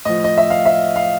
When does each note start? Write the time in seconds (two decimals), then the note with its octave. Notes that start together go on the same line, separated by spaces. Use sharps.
0.05 A2 F3 D#5
0.24 D#5
0.38 E5
0.50 F5
0.65 E5
0.96 F5